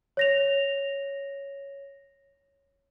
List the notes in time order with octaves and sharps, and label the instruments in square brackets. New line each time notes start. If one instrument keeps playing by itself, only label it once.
[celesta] C#5 A#6 F7